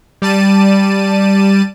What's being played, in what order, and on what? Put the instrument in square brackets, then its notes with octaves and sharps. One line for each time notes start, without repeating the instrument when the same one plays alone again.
[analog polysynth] G3 D5 A5 D#7